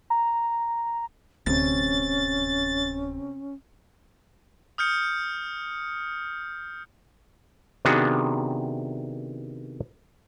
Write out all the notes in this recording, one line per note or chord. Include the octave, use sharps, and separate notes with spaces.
A#5
D1 D2 C3 C4 C#4 A6
D#6 F6 G6 C#7
C3 D#3 B3 D4 F#4 G#4